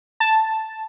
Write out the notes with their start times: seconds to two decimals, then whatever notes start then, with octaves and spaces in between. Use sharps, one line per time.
0.20 A5